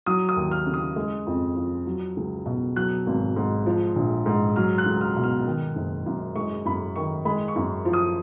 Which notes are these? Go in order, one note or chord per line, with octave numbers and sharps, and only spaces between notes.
F#3 D#6
D#6
D#2
F6
C#3
D#6
G#3
F2
F3
F#3
C#2
B2
F#3 F#6
G#1
G#2
F3
A#1
G#2
F#3 F6
F#6
C#2
F6
B2
F6
D#3
F#1
F#2
G#3 C#6
F#2 B5
D#3 C#6
G#3 B5
C#6
F#2
F3
D#6